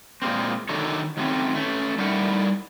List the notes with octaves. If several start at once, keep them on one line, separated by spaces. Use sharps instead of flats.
A#2 G#3 A#3 C4
D3 D#3 F#3 A4 A#4 C#5
D#3 F#3 A3 C4 C#4
A3 C#4
G3 A3 D#4 E4 A#4 F#5